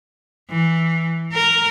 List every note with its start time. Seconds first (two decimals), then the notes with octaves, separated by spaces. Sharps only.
0.49 E3
1.32 A#4